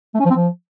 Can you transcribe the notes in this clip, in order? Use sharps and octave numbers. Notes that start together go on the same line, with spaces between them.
A3
C#4
F3
C4
F3